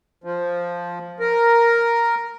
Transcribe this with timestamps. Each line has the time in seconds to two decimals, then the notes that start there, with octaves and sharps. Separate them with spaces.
0.24 F3
1.20 A#4